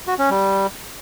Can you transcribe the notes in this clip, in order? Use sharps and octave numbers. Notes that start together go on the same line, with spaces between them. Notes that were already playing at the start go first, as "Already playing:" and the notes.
F#4
C#4
G3